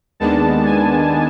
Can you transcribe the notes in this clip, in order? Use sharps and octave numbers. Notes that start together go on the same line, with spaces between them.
D#2 D#3 G#3 B3 D4 A5
G#5